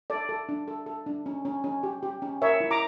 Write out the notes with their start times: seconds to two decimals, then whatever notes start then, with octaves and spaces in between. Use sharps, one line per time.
0.10 A4 D5
0.29 A4
0.49 D4
0.68 A4
0.86 A4
1.06 D4
1.26 C#4
1.45 C#4
1.64 C#4
1.83 G4
2.03 G4
2.22 C#4
2.42 A#4 C#5 E5
2.61 E4
2.71 A#5 D6